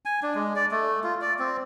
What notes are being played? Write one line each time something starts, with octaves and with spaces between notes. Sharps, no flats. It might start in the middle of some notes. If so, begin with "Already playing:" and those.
G#5
D4
G#3
D5
A3
F4
D5
C4